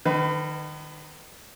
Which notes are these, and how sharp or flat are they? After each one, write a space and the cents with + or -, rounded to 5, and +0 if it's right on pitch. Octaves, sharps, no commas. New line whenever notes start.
D#3 -30 B4 +35 B5 +5